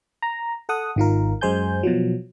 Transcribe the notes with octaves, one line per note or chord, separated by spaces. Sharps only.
A#5
A4 F#5 D#6
G#1 D#3 F4 A#4
F#2 G#3 C5 G#5 G6
B2 F3 F#3